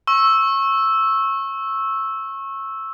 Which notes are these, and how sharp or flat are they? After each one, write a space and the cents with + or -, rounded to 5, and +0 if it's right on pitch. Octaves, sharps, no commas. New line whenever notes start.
C#6 -25 E6 +0